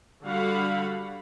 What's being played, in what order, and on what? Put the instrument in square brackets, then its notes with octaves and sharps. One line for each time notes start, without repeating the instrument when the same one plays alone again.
[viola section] D3 G3 F#4 F5 F#5 B5